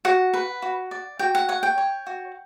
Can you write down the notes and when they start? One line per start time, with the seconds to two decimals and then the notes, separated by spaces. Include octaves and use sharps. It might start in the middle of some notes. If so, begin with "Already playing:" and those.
0.05 F#4 F#5
0.34 B4
0.62 F#4
0.91 D5
1.19 F#4 G5
1.35 F#5
1.49 C#5 F#5
1.63 G5
1.78 C#5
2.07 F#4